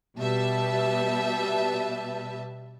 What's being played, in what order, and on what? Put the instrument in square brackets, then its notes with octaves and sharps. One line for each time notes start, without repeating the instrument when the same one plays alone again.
[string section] B2 G3 B4 E5 A5